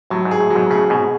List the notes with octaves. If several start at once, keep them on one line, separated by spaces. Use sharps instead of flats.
A2 F#3
G#2
G#4
A2
F#3
G#2 B2
A2 C#3 G#4
G#2 B2 G#4